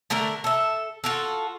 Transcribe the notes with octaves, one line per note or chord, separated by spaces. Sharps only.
D3 A3 D4 A#4
A4 E5
F4 F#4 A4